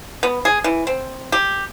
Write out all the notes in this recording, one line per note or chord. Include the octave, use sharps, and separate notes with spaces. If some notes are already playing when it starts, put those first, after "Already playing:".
B3
G#4
E3
C4
G4